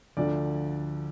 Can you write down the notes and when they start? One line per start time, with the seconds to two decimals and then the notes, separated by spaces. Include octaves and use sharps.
0.17 D2 D3 F3 D5